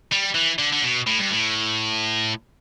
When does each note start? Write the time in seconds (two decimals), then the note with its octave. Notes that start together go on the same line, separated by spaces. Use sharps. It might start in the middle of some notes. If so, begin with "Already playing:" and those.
0.12 G3
0.34 E3
0.59 D3
0.72 D3
0.83 B2
1.07 A2
1.19 G2
1.31 A2